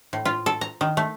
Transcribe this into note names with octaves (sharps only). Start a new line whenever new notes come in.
A2
F4
A4
A#5
D#3
A3